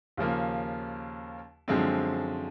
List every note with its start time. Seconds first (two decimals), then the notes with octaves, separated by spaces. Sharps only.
0.17 D#2 C#3 F3 A#3
1.68 F#2 D3 F3 G#3 C4